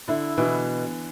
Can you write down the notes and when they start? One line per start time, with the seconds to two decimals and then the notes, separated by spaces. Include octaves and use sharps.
0.08 D3 E4
0.38 B2 E3